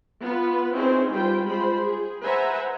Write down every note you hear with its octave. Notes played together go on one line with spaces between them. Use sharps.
B3 F4 B4
C4 C#4 D#4 E4 G#4 C5
G3 F4 B4 C5 G5
G#3 F4 C5 B5
G#4
B4 C5 E5 F#5 G#5 A#5